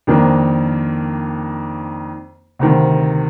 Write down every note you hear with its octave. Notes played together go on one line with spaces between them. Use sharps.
F2 D#3 A#3 D4
D2 C3 D#3